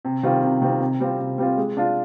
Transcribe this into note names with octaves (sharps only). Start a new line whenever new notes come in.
C3
D#3 G3 C4 F4
C3
D#3 G3 C4 F4
C3
G3 C4 F4
C3
G3 C4 F4
G#3
D4 F4